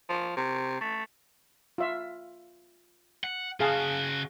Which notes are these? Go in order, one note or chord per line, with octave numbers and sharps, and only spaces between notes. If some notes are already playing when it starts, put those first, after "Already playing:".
F3
C3
A3
F4 E5
F#5
C#3 F#4 G#4 F5 A5